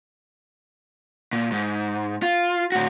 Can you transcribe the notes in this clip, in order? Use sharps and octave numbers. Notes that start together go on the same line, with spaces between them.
A#2
G#2
F4
A2 F#4